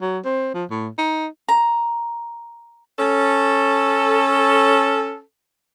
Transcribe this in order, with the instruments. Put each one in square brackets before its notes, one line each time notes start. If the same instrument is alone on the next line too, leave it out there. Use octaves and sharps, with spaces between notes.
[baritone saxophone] F#3
C4
F3
A2
D#4
[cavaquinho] A#5
[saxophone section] C#4 A4